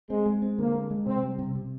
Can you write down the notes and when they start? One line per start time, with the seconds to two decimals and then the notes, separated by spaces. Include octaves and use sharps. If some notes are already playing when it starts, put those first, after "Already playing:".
0.10 G#3 C4
0.26 G#3
0.42 C4
0.58 D3 A#3
0.74 G#3
0.90 G#3
1.06 C3 C4
1.23 G3
1.39 C3
1.55 C3